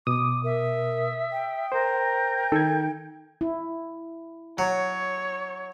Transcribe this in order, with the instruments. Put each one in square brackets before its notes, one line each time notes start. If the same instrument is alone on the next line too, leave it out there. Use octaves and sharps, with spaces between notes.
[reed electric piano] B2 [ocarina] D6 [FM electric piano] D#6
[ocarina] A#4 [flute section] E5
[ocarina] G5
[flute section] A#4 G6 [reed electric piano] C5
[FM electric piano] D#3 [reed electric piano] A4 G#6
[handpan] E4
[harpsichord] F#3 [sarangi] C#5